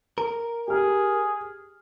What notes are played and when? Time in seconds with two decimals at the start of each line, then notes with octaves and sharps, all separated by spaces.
0.18 A#4
0.68 G4 G#4 F6